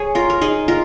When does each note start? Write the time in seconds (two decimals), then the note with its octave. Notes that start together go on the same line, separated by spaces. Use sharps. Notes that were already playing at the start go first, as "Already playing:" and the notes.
Already playing: G#4 C#5
0.15 F4 A#4
0.30 A#4
0.41 D#4 G#4
0.68 F4 A#4